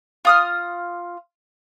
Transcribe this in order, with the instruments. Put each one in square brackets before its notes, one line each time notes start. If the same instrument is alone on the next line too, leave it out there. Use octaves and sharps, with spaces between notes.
[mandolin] F4 D#6 F6